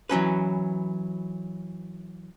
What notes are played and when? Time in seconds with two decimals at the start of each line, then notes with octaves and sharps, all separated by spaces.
0.09 E3 F#3 C#4 B4